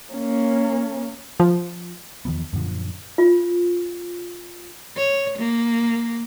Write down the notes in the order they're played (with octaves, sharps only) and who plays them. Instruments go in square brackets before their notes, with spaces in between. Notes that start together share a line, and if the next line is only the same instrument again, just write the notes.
[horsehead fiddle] A#3 C#4
[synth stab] F3
[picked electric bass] E2 D#3 F3 B3
F#2 A#2 D3 F3
[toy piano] F4
[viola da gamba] C#5
A#3